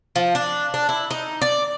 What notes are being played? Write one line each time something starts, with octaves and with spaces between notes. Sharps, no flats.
F3
D4
D4
E4
D#4
D5